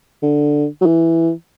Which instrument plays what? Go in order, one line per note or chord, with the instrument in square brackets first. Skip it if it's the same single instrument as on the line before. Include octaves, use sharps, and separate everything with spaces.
[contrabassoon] D3
F#3
E3